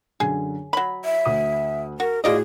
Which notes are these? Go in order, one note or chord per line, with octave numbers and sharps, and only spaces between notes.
F#2 D3 G#4
F#3 C#5 B5
E5
D2 D#6 D#7
F#4 A#4
A2 F4 F#4 G#4 D5 D#5